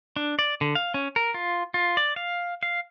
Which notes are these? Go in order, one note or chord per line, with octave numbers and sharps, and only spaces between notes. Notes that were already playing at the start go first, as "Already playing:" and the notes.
D4
D5
D3
F5
C#4
A#4
F4
F4
D5
F5
F5